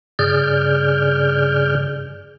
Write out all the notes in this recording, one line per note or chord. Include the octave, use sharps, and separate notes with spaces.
G2 C#3 G#4 D5 F6 G6